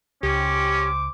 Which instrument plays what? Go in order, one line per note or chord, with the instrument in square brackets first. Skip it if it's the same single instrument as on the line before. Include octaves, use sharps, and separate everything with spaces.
[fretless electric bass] C#2 [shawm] C#4 [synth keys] G4 [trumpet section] C5 D6